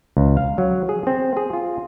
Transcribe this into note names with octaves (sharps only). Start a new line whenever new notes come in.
C#2
F5
F#3
G#4
C4
G#4
F4